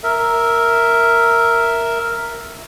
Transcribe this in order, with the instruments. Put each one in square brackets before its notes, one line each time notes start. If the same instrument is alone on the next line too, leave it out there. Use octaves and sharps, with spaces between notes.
[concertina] A#4 E5